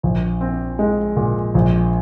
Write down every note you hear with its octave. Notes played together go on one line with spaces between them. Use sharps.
A#1
C4
G#3
A#2
A#1